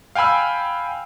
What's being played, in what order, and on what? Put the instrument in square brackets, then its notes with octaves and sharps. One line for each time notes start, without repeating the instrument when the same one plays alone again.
[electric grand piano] F5 G5 G#5 B5 E6